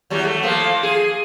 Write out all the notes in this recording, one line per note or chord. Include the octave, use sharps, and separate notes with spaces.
E2 F#3 G3
A3
F3 A3 A#3
G#4